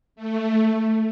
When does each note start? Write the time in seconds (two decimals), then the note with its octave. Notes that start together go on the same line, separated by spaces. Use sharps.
0.16 A3